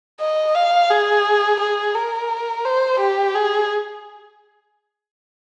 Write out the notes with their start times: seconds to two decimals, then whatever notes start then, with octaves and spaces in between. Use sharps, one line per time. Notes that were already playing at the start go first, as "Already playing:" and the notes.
0.20 D#5
0.55 F5
0.90 G#4
1.60 G#4
1.95 A#4
2.65 C5
2.99 G4
3.35 G#4